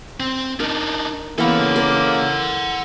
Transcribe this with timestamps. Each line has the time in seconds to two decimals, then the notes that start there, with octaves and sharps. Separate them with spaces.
0.20 C4
0.60 D4 D#4 A#4
1.38 C#3 E3 A#3 B3 A4 F#5
1.76 A#4 D5